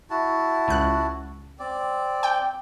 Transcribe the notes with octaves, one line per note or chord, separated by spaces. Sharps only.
E4 F#4 A5
C#2 F#6
C4 D5
G5